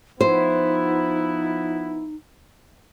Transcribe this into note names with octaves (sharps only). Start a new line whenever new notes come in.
F3 B3 D#4 E4 C5